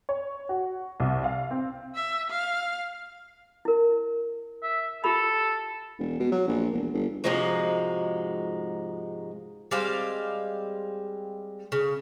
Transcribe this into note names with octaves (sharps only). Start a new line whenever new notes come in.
C#5
F#4
C2
F5
C4
E5
F5
E4 A#4
E5
F4 G4 A4 B5
E1
B2
F#3
A#1
E1
G1
G#2 C3 F3 G#3 D#4 F#4
G3 G#3 C4 F5
C#3